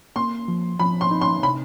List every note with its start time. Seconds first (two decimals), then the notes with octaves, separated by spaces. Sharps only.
0.16 A#3 C6
0.48 F3
0.79 F3 B5
1.01 C6
1.11 D#4
1.21 C6
1.43 C3 B5